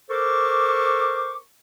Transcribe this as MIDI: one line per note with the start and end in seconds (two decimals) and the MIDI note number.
0.10 1.36 69
0.10 1.36 70
0.10 1.36 72
0.10 1.36 85
0.10 1.36 86